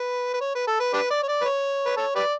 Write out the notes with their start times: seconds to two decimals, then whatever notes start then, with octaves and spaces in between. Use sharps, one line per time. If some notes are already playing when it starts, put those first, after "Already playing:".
Already playing: B4
0.34 B4
0.41 C#5
0.55 B4
0.67 A4
0.80 B4
0.93 D4 G4 B4
1.10 D5
1.23 C#5
1.28 D5
1.41 B4
1.45 C#5
1.86 B4
1.97 A4 C#5
2.15 G4 B4 D5